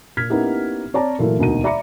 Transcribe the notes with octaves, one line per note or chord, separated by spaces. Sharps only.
A#2 F6 G#6 B6
A#3 B3 C#4 D#4 E4 G4
C4 C#5 D5 A5 A#5
A#2 E3 F#3 A3 E4 A#4
E1 D2 B2 A#3 D#4 D#7
D5 E5 A#5 B5 D6 C#7